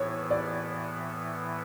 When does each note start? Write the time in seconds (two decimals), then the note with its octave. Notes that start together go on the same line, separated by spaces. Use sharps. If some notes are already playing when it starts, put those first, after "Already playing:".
Already playing: A2 E3 B3 E4 C#5
0.31 D5